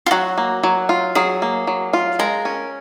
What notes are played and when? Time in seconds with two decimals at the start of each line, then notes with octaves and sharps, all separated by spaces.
0.06 F4
0.11 F#3 F#4
0.38 A#3
0.63 F#3
0.89 F4
1.15 F#3 G#4
1.42 A#3
1.67 F#3
1.93 F4
2.19 G#3 A#4
2.45 C#4